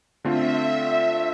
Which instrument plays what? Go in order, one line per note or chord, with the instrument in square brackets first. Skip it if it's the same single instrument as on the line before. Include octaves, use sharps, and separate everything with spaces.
[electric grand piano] D3 A3 C4 F4 [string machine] E5
[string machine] E5